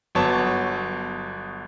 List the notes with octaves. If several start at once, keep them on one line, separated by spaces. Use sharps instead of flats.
G1 F#3 B3 C#5 A5